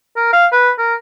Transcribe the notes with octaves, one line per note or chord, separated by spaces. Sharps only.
A#4
F5
B4
A#4